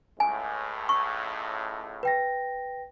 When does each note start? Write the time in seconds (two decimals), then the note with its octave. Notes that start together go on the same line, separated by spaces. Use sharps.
0.20 C#2 A2 G#5
0.89 C#6
2.03 B4 G5 A#6